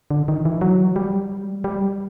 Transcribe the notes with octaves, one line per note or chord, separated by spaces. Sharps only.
D3
D#3
E3
F#3
G3
G3